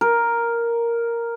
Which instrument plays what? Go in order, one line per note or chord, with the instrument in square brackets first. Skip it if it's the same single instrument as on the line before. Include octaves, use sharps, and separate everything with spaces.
[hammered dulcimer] A#4